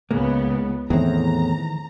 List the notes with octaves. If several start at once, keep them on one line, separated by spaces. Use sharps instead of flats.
C#2 C#3 G#3 A#3 B3
E2 A2 D#3 E3 C4 A#5